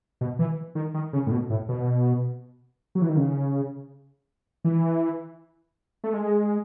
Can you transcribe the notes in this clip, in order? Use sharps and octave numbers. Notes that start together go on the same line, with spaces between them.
B2
E3
D#3
D#3
C#3
A2
B2
A2
B2
F#3
E3
D#3
C#3
E3
A3
G#3